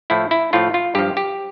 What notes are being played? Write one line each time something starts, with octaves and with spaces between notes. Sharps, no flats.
A2 F3 E4
E4
A2 F3 F4
F4
G2 F3 G4
G4